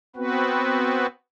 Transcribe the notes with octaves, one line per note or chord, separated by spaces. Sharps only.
B3 C4 F#4 B4